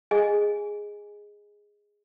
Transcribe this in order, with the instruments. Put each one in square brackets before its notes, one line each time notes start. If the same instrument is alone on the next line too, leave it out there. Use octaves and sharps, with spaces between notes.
[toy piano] G#4 D#5 G#5